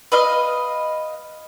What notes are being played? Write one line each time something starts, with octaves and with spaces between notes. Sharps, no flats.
B4 D#5 F5